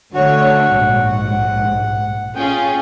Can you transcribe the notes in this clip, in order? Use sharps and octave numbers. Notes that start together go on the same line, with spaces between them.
D3 A3 F#4 C#5
A#1 G#2
F#5
C#4 F4 G#4 G5